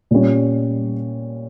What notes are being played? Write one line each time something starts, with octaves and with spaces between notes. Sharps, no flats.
A#2 G3 C#4